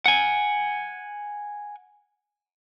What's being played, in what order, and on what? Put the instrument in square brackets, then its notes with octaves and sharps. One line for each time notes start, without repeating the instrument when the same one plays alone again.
[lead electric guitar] F#5 G#5